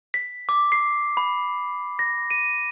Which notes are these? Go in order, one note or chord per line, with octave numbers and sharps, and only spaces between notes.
B6
D6
C7
B5
A#6
D#7